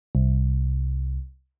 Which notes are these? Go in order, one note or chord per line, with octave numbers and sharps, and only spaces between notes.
C2